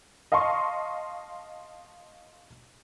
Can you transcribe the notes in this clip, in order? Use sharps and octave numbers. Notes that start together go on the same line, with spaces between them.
D#5 F5 A5 C6 C#6